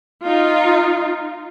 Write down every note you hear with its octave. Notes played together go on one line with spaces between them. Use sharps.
D#4 F4